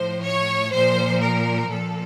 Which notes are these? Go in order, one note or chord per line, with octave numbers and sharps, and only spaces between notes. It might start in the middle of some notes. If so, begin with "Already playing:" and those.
Already playing: A2 F3 C5
C#5
A#2 F3 C5
A#4
A#2 F3 A4